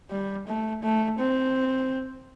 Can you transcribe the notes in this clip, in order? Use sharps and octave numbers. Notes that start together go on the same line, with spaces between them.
G3
A3
A3
C4